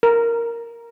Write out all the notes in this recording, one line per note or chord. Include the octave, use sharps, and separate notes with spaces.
A#4